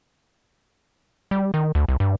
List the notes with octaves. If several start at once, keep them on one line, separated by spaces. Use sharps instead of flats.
G3
D#3
D2
C2
G2